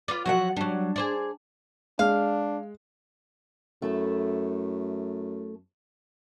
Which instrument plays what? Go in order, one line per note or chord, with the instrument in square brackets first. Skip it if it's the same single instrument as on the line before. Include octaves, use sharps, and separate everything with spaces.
[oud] F4 B4 D5
[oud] F3 F#3 [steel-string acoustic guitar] F#4 E5 F#5
[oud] F#3 G3 [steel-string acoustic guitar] D4
[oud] G#4 C5 D5
[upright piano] G#3 [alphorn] D4 [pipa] F5
[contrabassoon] F#2 [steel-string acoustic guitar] A3 E4 A4